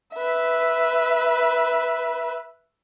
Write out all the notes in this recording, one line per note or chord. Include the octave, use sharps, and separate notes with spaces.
B4 E5